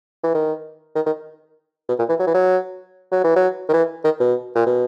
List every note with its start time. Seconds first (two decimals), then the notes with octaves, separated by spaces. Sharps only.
0.23 E3
0.35 D#3
0.96 D#3
1.06 D#3
1.88 B2
1.99 A#2
2.09 E3
2.19 F#3
2.27 E3
2.34 F#3
3.12 F#3
3.24 E3
3.36 F#3
3.69 D#3
3.73 E3
4.04 D#3
4.20 B2
4.55 A#2
4.66 B2